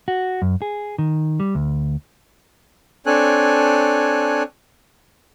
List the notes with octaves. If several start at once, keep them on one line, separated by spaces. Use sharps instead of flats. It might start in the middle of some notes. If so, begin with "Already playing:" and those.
F#4
F#2
G#4
D#3
G3
D2
C4 D4 A4 C#5 G#5 F#6